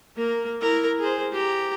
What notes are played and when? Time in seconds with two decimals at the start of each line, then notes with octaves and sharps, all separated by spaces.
0.16 A#3 A#4
0.61 E4 A#4
0.99 G#4 C5
1.33 G4 A#5